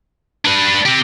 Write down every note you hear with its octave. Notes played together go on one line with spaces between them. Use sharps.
D4 B4
C4 G4